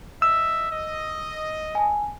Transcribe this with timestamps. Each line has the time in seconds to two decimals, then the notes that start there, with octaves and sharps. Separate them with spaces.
0.22 D#5 E5 E6
0.71 D#5
1.75 G#5 A5